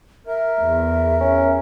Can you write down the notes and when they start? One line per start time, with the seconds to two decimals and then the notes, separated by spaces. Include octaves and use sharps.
0.27 A#4 E5
0.60 E2
1.20 C#4